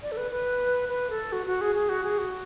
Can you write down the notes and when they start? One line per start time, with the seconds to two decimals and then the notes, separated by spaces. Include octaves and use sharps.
0.03 D5
0.12 A4
0.17 B4
0.31 B4
0.89 B4
1.10 A4
1.32 F#4
1.47 F#4
1.61 G#4
1.75 G#4
1.89 F#4
2.04 G#4
2.18 F#4